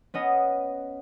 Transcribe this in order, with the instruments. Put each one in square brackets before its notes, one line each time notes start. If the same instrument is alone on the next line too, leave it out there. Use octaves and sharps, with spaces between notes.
[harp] B3 C#4 D#5